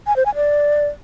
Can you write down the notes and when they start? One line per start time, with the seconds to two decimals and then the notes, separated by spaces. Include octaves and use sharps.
0.07 G#5
0.16 C5
0.26 G#5
0.35 D5